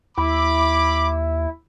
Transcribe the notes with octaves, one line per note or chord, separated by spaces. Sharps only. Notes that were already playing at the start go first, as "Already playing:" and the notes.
D#2 E4 B5 D6